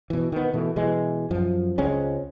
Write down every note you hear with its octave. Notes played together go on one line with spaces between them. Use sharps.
B2 E3
D#3 B3
B2 E3 A3
B2 E3 G#3
F#2 F3
C#2 G#3 C4 C#4